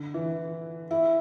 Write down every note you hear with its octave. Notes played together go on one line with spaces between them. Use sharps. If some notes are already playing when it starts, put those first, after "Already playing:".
Already playing: D3
E3
E4